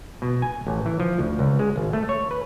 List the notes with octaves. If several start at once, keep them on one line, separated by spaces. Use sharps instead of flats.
B2
G#5
A1
E3
F3
D2
C#2
G#3
G#1
A3
C#5
B4